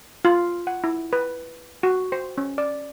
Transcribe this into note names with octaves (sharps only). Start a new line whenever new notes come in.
F4
F#5
E4
B4
F#4
C5
C#4
D5